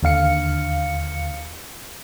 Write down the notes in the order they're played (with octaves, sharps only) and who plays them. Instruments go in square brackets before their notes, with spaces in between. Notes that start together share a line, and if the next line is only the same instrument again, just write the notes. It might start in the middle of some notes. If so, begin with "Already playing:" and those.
[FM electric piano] D#2 D3 F5 C#7